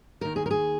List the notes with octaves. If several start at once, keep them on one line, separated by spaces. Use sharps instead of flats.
D#2 D#3 A#4
G#4
A#4
G#4